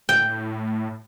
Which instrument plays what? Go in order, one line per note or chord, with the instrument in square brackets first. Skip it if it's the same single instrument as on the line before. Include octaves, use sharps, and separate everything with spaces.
[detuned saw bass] A2 [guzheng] G5